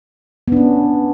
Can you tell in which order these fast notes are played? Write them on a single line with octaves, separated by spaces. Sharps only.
B3 D4 C#4